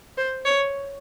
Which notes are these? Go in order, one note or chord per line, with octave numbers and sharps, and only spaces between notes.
C5
C#5